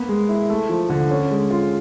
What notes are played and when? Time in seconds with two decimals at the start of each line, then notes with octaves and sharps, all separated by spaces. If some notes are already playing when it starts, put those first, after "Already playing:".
Already playing: A#3 B3
0.09 G#3
0.29 E4
0.50 A3
0.69 F3
0.90 D3
1.11 C#4
1.31 G#3
1.51 F4